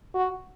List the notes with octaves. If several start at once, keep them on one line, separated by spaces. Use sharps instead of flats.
F#4